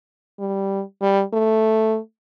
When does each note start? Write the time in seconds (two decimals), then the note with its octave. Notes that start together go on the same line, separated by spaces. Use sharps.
0.39 G3
1.02 G3
1.33 A3